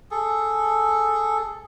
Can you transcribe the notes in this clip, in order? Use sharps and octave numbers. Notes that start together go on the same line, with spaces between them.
G#4 A4